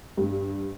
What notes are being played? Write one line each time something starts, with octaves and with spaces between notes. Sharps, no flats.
G2